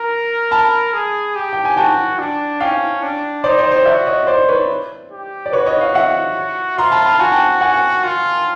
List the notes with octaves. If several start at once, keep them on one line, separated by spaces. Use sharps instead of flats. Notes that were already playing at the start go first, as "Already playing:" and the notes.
Already playing: A#4 A#5
A5 B5
G#4
G4
G5
G#5
F#4 G5 A5
D4
C#4 F5 G5
D4
D#4 C5 D5
C5 D5
C5 D5
F#4 D5 E5
C#5 D#5
C5 D5
B4 C#5
G4
D5
F#4 B4 C#5
C#5 D#5
D#5 F5
E5 F#5
F4 A#5 C6
A5 B5
A5
F#4 G#5
G5 A5
F#5 G#5
F4